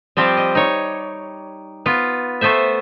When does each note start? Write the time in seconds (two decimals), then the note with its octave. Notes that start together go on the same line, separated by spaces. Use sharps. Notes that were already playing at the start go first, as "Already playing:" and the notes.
0.17 F3 G3 C4 G4
0.37 D#5
0.55 D#4 C#5
1.86 B3 F4
2.41 A3 B3 C5 E5